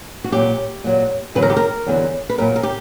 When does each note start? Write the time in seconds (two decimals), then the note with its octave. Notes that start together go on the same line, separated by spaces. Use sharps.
0.24 F#4
0.32 A#2 F#3 G4
0.84 A#2 F#3
1.35 E2 D3 F#3 B4
1.42 A#4
1.50 G4
1.57 A#4
1.86 E2 D3 F#3
2.30 B4
2.38 A#2 F#3 A#4
2.56 A#4
2.63 G4